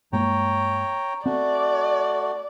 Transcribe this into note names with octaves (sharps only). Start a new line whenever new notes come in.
G2 G#3 A#3 C#5 G5 A#5
A3 C4 F#4 D5